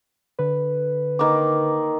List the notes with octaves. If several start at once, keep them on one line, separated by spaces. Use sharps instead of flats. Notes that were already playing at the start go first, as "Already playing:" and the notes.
D3 B4
D#3 A#3 D6